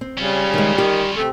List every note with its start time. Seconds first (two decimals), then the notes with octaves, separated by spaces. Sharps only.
0.01 C4
0.18 C#3 G3 C#4 F4
0.54 D#3 G#3
0.78 D#3 G4
1.16 C3 A3 C4